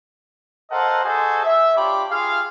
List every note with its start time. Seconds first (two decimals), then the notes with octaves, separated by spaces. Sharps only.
0.71 A4 A#4 C5 D#5 F5 F#5
1.03 F#4 G#4 A4 C5 D#5 G#5
1.44 E5
1.75 D4 F4 G4 C#5 B5 D6
2.10 F4 G4 G#4 F5